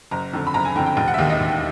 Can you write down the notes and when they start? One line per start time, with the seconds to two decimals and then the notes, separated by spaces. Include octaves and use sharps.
0.11 F#1 A#5
0.33 F2 D3
0.47 B5
0.54 F#1 A#5
0.65 G#5
0.76 D3 G5
0.79 F2
0.86 G5
0.97 E1 G5
1.08 F#5
1.14 E5
1.18 D#2 D#3 F5
1.30 D#5
1.40 E1